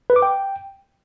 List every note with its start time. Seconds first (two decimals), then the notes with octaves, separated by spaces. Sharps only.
0.10 B4
0.16 D6
0.22 G5